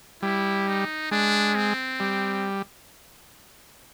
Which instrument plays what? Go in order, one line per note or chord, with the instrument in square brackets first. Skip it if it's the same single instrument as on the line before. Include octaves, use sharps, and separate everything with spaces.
[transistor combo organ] G3 [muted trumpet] E4
[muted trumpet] D#4
[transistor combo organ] G#3 [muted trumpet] D4
[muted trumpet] C4
[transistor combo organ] G3